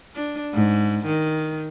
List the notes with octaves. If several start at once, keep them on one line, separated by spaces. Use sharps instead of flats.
D4
G#2
D#3